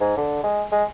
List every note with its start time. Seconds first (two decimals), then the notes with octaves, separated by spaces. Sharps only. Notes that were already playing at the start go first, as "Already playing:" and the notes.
0.01 G#2
0.17 D3
0.43 G#3
0.72 G#3